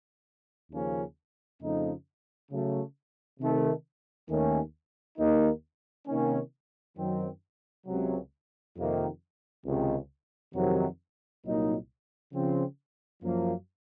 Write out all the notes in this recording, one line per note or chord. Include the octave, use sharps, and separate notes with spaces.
D#2 C#3 F3 A#3 C#4
F2 C#3 F3 A3 D#4
C#3 F#3 A3
C3 D#3 A3
D#2 D#3 A3 C#4
D#2 D#3 A#3 D#4
C3 D#3 A#3 C#4
F#2 D#3 F#3 C4
C#2 C3 F#3
F2 C3 D#3 A#3
C#2 C3 D#3
F2 C3 D#3 F#3
C2 A#2 F#3 A#3 D#4
C#3 F3 C4
F#2 F3 A#3